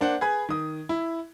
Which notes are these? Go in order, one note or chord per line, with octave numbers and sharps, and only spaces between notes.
A#3 D4 C5 F#5
G#4 B4 G#5 B5 G#6
D#3 D#6
E4